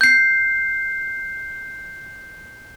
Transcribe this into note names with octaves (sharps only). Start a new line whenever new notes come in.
G6 C7